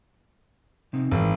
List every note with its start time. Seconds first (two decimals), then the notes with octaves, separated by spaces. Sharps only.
0.93 C3 C4 D#4
1.11 G#1 E3 C5